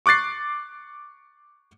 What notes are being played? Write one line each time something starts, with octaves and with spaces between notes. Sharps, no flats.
C#6 D6 F#6 A6 C7